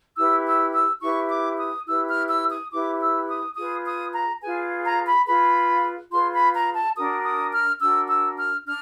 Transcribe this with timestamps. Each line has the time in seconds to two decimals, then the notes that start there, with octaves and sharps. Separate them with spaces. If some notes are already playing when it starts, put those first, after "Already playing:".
0.16 E4 G4 B4 E6
0.45 E6
0.73 E6
1.01 E4 G4 B4 C#6
1.29 D6
1.58 D#6
1.86 E4 G4 B4 E6
2.08 F6
2.29 E6
2.50 D#6
2.71 E4 G4 B4 D6
3.00 E6
3.27 D#6
3.56 F4 G#4 B4 D#6
3.85 D#6
4.13 A#5
4.41 F4 G#4 B4 G#5
4.84 A#5
5.06 B5
5.26 F4 G#4 B4 B5
6.11 F4 G#4 B4 C6
6.33 B5
6.54 A#5
6.74 A5
6.96 D4 F#4 A#4 D#6
7.24 D#6
7.52 F6
7.80 D4 F#4 A#4 E6
8.09 E6
8.37 F6
8.66 D4 F6